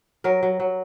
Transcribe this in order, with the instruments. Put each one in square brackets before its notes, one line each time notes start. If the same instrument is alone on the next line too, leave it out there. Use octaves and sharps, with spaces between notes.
[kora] F#3 A#4
F#3
F#3